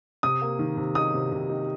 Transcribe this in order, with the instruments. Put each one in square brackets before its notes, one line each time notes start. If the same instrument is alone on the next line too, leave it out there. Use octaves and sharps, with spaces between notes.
[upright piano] C3 D#6
A#3
D#3
C3
D#4 D#6
C3
C3
D#4